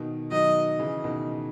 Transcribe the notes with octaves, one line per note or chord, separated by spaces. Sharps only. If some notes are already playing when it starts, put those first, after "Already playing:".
Already playing: B2 D#3
D#3 F#3 D#5
C#3 E3
B2 D#3